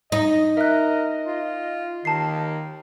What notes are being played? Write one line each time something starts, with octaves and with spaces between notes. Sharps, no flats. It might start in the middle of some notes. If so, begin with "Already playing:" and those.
D#4 D#5
A#4 E5 F#6
F4
D#2 D#3 A5 C7